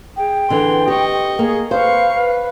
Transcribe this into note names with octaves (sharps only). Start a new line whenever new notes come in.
G#4 G5
D3 E3 C6
G4 D#5 C#6
A#3 G#4
B4 C5 F5 C#6
B4